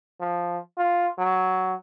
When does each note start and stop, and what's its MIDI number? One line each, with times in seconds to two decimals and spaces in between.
0.21 0.59 53
0.78 1.08 65
1.19 1.74 54